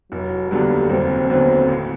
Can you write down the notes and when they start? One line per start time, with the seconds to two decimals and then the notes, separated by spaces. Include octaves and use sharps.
0.11 F1 F#3
0.51 D#2 D3 F#3 G3 B3
0.90 F1 C4
1.29 D#2 D3 F#3 B3 C4
1.68 A1